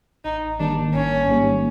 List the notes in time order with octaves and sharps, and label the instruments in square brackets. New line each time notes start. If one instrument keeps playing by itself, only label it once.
[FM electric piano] A1 [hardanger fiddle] D#4
[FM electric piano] G#2 D#3 G3 A#3 [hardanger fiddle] D4
[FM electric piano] A1 [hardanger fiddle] C#4
[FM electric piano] G#2 D#3 G3 A#3